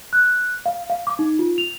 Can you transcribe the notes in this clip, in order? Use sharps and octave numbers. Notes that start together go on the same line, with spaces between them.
F#6
F5
F5
D6
D#4
F4
F7